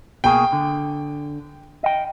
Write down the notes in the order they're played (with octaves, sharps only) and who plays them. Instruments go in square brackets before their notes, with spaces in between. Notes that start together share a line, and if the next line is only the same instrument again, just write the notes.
[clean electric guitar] B2 A#3 G#4 [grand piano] G5
[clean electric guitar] D3
D#5 G5